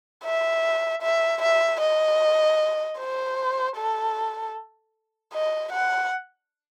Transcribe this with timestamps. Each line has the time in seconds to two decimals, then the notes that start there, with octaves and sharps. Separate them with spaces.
0.25 E5
1.02 E5
1.42 E5
1.81 D#5
2.99 C5
3.76 A4
5.34 D#5
5.73 F#5